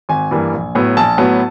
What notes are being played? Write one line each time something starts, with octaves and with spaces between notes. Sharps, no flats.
G#1 G#5
G2 E3 G3 A#3
A#1
A2 F#3 B3
A#1 A5
A2 F#3 B3